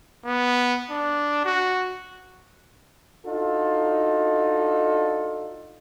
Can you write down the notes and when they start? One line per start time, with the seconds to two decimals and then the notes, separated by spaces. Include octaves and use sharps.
0.25 B3
0.90 D4
1.44 F#4
3.25 D4 D#4 F4 F#4 A4